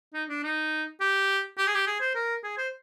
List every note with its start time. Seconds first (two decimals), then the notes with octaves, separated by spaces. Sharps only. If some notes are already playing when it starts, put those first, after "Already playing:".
0.13 D#4
0.29 D4
0.43 D#4
1.00 G4
1.58 G4
1.67 G#4
1.75 G4
1.87 G#4
2.00 C5
2.15 A#4
2.43 G#4
2.58 C5